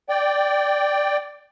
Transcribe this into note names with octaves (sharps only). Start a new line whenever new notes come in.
D5 G5